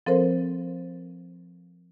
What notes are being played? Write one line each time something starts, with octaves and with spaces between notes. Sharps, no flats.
F3 C4 A4 A#4 C5